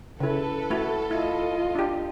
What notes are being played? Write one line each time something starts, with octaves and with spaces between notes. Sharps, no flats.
C#3 E4 A4 B4
A3 E4 F#4
E4 F4 D#5
D4 G4